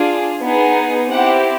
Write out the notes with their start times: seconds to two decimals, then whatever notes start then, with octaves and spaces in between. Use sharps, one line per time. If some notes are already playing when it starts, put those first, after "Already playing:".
Already playing: D4 F4 G#4
0.41 B3 D#4 G#4
1.11 C4 E4 G4 F#5